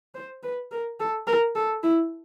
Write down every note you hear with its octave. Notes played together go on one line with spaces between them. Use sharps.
C5
B4
A#4
A4
A#4
A4
E4